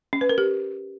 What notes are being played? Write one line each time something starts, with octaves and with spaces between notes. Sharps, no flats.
C#4
B4
A#4
G4